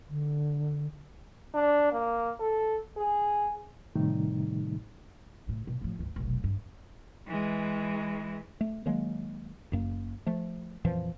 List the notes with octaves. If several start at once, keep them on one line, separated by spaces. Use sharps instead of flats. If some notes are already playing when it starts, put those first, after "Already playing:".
D3
D4
A#3
A4
G#4
A2 C3 D#3 G3 A3 D#4
A2 C#3
B2
A2 F3
G1 D2
F1 B1
G2
E3 G#3
A3
D#3 F#3 G#3 A#3
F#1 F#2 A#3
F3 A3
F2 A#2 E3 F3